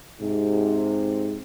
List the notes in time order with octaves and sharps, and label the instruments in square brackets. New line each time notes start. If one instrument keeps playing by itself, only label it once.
[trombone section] G#2 C3